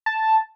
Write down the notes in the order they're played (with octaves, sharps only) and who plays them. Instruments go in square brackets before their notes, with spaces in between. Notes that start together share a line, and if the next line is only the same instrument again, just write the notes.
[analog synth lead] A5